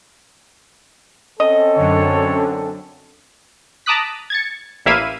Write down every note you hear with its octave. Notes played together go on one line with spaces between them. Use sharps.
C4 C#4 A4 D#5
F#2 D3 C#5
A5 A#5 D6 D#6 F#6 B6
G#6 A6 C#7
A1 A#3 E4 E5 F5 D#7